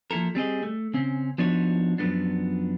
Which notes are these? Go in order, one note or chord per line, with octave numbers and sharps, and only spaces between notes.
F3 A#3 E4 A4 A#4
G3 C4 G#4 D#5
A3
C#3 C4 C#4
F3 B3 D4 D#4 F#4 C#5
F#2 F3 F#3 G#3 B3 D4